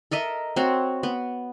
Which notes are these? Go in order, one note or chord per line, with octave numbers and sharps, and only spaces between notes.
A4 A#4 D#5 E5
C4 F#4 C#5
B3